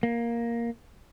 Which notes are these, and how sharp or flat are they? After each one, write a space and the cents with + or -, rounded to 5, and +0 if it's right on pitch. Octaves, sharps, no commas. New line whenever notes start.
A#3 +5